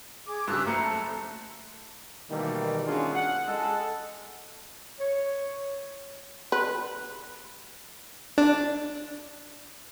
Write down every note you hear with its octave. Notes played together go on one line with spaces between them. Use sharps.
G#4 D6
G2 C#3 G3 E6 F#6
F#1 A3 C5 A#5 C#7
A5
B2 D#3 E3 G3 A3 A#3
C#4 D4 F4 F#4 G#4
F#5
G#3 A4
C#5
B4
D4